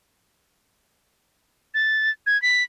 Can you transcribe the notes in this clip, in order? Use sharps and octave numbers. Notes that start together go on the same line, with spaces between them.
A6
G#6
B6